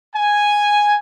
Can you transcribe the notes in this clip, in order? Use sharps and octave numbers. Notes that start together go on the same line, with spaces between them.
G#5